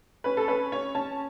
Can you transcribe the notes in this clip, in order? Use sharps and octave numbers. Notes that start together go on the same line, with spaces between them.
C#4 B4
A4
C#4 B4
C#4 C#5
C#4 A5